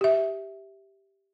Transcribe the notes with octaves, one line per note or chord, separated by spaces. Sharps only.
G4 E5